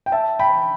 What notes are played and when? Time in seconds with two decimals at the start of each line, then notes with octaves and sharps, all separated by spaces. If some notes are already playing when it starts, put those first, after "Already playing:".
0.06 G5
0.12 E5 A5
0.39 G5 B5